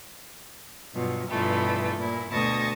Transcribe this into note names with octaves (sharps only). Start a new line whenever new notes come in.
G2 B2 F3 F#3
G2 B2 E3 F3 A3 E4
A#2 E4
D2 B2 A5 C#6 D#6 A#6